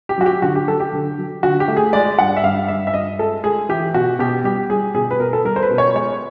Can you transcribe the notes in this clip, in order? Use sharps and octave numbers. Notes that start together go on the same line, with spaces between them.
G4
F#3 F#4
G4
D3 F#4
G4
F#3 A4
G4
D3
F#3
D3 F#4
G4
A3
G#4
G#3 D5
G2 F#5
E5
G2 F5
G2 E5
E5
G2 D#5
G#3 A4
G#3 G#4
E3 G4
B2 F#4
B2 G4
G3 G4
G3 G#4
B2 G#4
B4
B2 A#4
A4
G3 A#4
C5
B4
B2
C#5
G#3 C#5